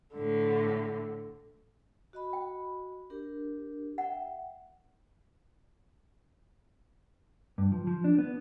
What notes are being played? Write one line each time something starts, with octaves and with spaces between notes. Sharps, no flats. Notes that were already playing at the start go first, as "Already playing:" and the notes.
A2 D3
F#4 D#5 B5
G5
D4 G4 A#4
E5 F#5 G5
G2
F3
F3
D4
B3